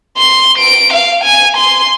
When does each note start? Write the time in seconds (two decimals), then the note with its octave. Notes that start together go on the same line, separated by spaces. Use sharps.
0.18 C6
0.58 D7
0.93 F5
1.24 G#5
1.57 C6